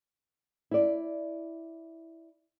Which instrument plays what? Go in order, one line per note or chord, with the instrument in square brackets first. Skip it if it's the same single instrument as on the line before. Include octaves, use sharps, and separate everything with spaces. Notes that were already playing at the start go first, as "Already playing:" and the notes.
[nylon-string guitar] E4 D5